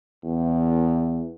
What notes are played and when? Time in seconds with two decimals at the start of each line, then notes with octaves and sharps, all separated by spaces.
0.23 E2